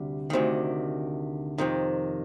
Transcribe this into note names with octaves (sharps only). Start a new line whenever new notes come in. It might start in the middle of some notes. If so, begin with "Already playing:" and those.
Already playing: D2 C3 G3
D2 C3 D#3
F2 C3 D#3